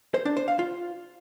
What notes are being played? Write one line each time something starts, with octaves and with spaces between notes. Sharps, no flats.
C5
D4
C5
F5
F4